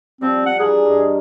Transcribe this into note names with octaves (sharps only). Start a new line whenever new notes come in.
F3 G3 C4
F#5
E3 D4 G#4 A#4
G2 D#5